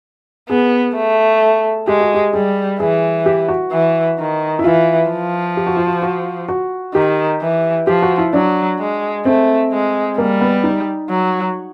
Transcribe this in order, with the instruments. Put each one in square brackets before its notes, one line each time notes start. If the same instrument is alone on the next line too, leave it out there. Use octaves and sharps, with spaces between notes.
[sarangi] B3 [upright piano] G#4
[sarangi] A3
[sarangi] G#3 [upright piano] G4
[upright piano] F#4
G4
[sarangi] G3 [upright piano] G#4
[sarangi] E3 [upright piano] G#4
[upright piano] G4
F#4
[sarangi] E3
D#3
[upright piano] E4
[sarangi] E3 [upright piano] F4
[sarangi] F3
[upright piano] G4
F#4
F4
F#4
F#4
F#4
[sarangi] D#3 [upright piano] G4
[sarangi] E3
[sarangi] F3 [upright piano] G4
[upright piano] F#4
E4
[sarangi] F#3 [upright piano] D4
[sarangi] G#3
[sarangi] A3 [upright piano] C4
[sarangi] G#3
[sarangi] G3 [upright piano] A#3
[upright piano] B3
D#4
[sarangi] F#3